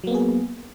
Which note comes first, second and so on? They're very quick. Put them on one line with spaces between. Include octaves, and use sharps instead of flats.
F#3 A#3 B3 G#4